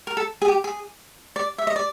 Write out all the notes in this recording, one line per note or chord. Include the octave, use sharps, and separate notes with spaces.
A#4
A4
G#4
G4
G#4
D5
E5
D#5
D5